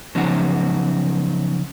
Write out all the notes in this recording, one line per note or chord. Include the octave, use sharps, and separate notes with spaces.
C#3 F3 F#3 B3 D#4 F#5